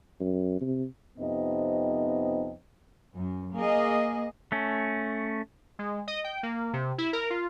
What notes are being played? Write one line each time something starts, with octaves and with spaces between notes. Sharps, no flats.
F#2
C3
F2 C3 B3 D#4 D#5
F#2
A#3 G#4 D#5
A3 C#4
G#3
D#5
G5
A#3
C3
E4
A#4
F4